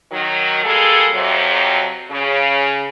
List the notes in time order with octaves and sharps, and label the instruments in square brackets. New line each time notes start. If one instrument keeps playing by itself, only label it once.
[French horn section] D#3 F#3
G3 G#3 A#3 G#4 A4
F2 C3 F#3
C#3